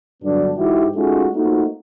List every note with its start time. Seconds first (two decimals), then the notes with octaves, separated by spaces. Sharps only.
0.22 G2 D3 F#3 B3 D4
0.56 G#2 E3 E4 F#4 G4
0.95 G#3 A3 C#4 D#4 F4 F#4
1.34 A3 A#3 C4 D#4 F4 F#4